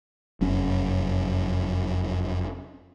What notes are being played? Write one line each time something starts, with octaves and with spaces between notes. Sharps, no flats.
F1 F#2 C#4